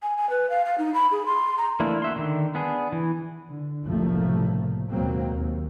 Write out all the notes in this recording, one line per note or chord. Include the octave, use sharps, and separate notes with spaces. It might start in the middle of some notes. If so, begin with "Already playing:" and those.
G#5
G#5
B4
F5
F5
D#4
B5
G#4
C6
A#5
E3 A3 A#3 D4 E4
F#4 E5 C6
D3 D#3
B3 D4 G#4
E3
D3
F#1 C2 A2 F3 A3 A#3
D#2 G#2 B2 F#3 A#3 C4
D#2